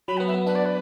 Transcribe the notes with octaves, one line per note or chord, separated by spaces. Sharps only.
F#3 B5
F#5
B3
E5
B3
D4 B4
D5
B4